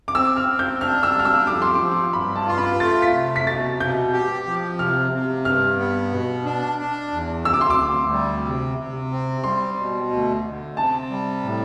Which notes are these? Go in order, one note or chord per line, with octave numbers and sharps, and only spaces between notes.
D6
C4 E6
F6
C4
G6
D4 F6
E6
G3 F6
E6
F2 D6
C6
D6
F3
G2 B5
A5
F4 C6
B5
A3 A6
B6
C3
B6
B2 A6
B2 G6
G4
F3
C3 F6
C3
G2 F6
B3
B2
D4
D4
E2
D2 E6
D6
C6
D6
D2
G3
C3
C3
C4
G3 C6
B2
D2
D2
C3 A5
G3
A2